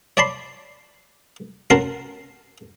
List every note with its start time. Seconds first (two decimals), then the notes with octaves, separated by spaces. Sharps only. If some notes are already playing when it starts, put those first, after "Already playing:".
0.17 C#5 D5 A5 B5 C6
1.70 C#4 F#4 A#4 A5 C6